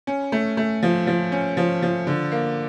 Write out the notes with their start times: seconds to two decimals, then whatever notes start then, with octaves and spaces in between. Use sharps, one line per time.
0.07 C#4
0.32 A3
0.57 A3
0.83 F3
1.07 F3
1.32 C#4
1.57 F3
1.82 F3
2.07 D3
2.32 A#3